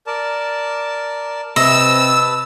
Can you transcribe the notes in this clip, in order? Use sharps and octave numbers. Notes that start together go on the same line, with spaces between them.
A#4 D5 A5
C3 B4 D#5 A5 E6